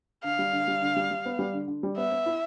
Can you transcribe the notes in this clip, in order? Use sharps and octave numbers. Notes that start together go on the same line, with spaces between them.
D3 F5
G3
D3
G3
D3
G3
G3
B3
G3
D3
D3
G3
B3 E5
B3
E4